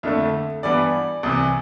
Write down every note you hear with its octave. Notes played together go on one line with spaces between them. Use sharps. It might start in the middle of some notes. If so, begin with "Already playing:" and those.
F2 D3 A3 E5
G2 E3 G3 B3 D5
C2 C3 E3